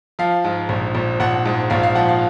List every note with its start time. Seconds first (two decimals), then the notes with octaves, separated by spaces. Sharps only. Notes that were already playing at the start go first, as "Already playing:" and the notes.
0.19 F3 F5
0.44 G#2
0.69 A#1
0.95 A#1
1.20 A#1 F#5
1.45 G#2
1.70 A#1 F5
1.83 F5
1.95 F3 F#5
2.09 F5